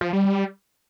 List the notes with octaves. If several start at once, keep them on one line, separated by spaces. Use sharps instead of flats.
F3
G3
G3